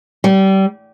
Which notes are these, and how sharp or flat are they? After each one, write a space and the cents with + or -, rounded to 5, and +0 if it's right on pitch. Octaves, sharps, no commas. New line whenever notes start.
G3 -25